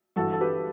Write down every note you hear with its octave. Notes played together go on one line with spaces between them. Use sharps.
G1 G2 E3 F#4 A4
A4
G4 B4